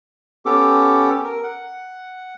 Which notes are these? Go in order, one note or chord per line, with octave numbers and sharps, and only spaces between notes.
B3 C#4 G4 A4 D6
A#4
F#5